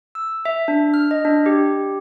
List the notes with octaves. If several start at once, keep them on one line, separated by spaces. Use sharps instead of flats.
E6
E5
D4
F6
D#5
D4
G4